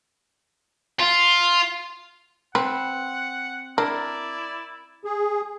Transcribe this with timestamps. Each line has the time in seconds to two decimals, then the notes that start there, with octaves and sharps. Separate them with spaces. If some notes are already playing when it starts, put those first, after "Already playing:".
1.00 F4
2.55 C4 B4 F#5
3.78 D4 E4 A#4 D5
5.05 G#4